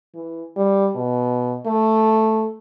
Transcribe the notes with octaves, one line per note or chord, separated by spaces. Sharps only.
E3
G3
B2
A3